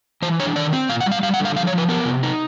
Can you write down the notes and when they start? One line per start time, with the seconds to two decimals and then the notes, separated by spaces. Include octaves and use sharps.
0.22 E3 C5
0.40 D4 C#5
0.56 D#3 D5
0.73 C4
0.89 A#2 F5
1.00 F#5
1.06 G3
1.12 F5
1.23 G3 F5
1.34 F#5
1.40 D3
1.45 F5
1.56 F3 F5
1.67 C#5
1.73 F3
1.78 B4
1.89 B3 A#4
2.05 C3
2.23 D#4